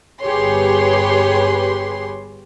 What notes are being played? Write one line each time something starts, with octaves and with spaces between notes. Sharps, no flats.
G1 G4 G#4 B4 C#5 C6